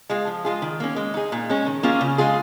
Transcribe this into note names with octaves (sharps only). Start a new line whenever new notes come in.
G#3 F4 G#4
F3
G#3 F4 G#4
D#3
A#3 C#4
G#3
D#4 G#4
A#2
G#3 C#4
D#3
A#3 C#4 F4 G#4
C#3
G#3 F4 G#4